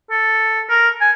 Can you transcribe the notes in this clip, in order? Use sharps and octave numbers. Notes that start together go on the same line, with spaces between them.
A4
A#4
G#5